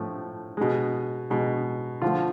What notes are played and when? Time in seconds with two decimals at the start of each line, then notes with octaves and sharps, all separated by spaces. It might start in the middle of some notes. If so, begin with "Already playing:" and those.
Already playing: A2 F3 A3
0.57 B2 G#3
1.30 B2 G#3
2.02 D3 F3 A3 F4